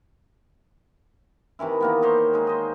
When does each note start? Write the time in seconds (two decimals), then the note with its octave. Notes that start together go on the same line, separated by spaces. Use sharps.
1.59 C3 D#3 E3 E4
1.81 D#3 A#3 B3
2.02 D#4 G4 C5 C#5
2.33 G#3 D#4
2.47 C5 D#5